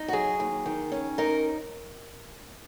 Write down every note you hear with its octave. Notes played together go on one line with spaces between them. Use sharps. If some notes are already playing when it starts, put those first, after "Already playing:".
Already playing: D#4
F#4
F#3 G#4
D#2
D#3
C#4
D#4 A#4